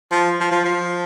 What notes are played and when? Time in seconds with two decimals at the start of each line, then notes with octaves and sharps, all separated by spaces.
0.11 F3
0.40 F3
0.52 F3
0.64 F3